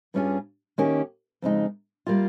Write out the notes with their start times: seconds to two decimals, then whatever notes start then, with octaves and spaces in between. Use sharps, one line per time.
0.14 G2 G3 C#4 F4 G#4
0.78 D#3 A#3 C#4 G4
1.42 F2 C#3 G#3 D#4
2.06 G3 A#3 F4